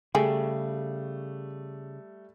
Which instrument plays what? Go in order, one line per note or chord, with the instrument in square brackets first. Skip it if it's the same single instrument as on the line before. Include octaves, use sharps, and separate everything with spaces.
[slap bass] C#3 [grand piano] G3 A3 [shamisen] G#4 G5